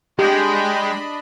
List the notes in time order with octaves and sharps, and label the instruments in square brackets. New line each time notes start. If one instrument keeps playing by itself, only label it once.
[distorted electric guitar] G#3 [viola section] D4 D#5 B5 [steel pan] G4 [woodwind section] G5